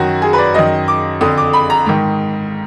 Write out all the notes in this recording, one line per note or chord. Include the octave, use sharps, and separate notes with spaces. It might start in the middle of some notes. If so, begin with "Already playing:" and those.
Already playing: F#2 D#3 F#4
G#4
B4
D5
F#2 D#3 D#5
D6
F2 D3 D#6
D6
B5
A#5
G#2 D#3